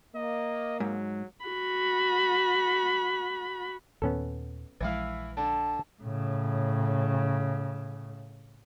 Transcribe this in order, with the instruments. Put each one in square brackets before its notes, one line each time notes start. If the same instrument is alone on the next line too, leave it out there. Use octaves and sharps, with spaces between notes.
[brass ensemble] A#3 [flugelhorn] D#5
[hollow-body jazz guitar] G#2 [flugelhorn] F#3
[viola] F#4 B5
[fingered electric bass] D#2 A#2 D#3 [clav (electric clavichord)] B3 C#4 A4
[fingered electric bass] A#1 F3 G#3 [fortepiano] E3 E4 F5
[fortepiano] D3 [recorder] A5
[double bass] A2 C#3